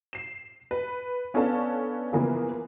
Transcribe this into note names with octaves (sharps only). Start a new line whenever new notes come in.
C7 E7
B4
B3 C#4 D4 A4 F5 A5
C#3 E3 F3 A#3 B3